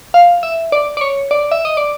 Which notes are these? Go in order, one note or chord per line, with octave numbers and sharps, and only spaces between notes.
F5
E5
D5
D5
C#5
D5
E5
D#5
D5